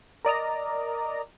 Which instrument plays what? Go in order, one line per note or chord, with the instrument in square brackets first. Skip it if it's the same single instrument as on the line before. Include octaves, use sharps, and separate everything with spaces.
[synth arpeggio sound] A#4 D5 D#5 A#5